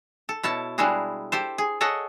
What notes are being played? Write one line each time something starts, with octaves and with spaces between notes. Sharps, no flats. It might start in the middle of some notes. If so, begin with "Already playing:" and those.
A4
B2 E4 C#5 A5
G3 G#3 D4 E4 F#4 G#4
G4 A4 C5
G#4
G#4 A4 C#5 D#5 F#5